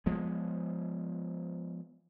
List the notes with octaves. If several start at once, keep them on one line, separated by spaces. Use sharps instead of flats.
F3 G#3 B3